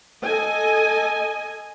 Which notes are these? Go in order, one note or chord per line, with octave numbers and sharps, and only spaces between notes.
A4 D#5 G#5